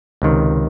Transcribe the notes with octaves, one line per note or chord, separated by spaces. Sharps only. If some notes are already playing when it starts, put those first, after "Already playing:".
C#2 C3 D#3